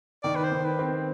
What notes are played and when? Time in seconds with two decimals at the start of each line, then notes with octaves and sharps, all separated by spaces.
0.23 D#3 D5
0.36 B4
0.44 C5
0.51 D#3
0.65 B4
0.79 C4